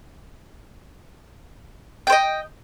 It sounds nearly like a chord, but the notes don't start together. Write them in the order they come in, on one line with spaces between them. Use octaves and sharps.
G5 C5 D#5